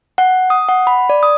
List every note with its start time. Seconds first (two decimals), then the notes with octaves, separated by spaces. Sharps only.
0.18 F#5
0.50 D#6
0.69 F#5
0.87 B5
1.09 D5
1.23 D#6